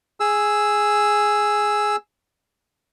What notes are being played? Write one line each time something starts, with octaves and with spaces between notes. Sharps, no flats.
G#4 E6